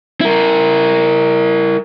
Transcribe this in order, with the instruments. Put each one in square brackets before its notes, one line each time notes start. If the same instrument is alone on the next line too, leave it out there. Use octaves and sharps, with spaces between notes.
[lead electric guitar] E4 A#4